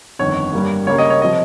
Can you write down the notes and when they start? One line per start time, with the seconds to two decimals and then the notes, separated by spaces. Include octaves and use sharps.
0.19 G1 F2 D#3 C#5
0.53 G2 G3 A#3
0.87 C#2 C#3 G3 A#3 C#5
0.98 D#5
1.10 C#5
1.22 C3 F3 D#5